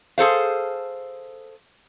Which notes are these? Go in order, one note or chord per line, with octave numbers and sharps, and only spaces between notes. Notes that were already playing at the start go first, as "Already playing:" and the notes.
G#4 A4 C5 F5